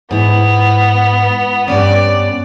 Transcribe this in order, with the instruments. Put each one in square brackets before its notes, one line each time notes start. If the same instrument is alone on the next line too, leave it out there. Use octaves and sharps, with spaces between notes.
[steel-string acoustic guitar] G#2 E4 [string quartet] B3
[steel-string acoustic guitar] G2 B3 C#4 [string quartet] D5